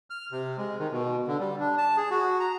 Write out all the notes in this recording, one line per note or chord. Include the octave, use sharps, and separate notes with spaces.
F6
C3
G#3
D#3
B2
D3
G3
D4
A5
G#4
F#4
A#5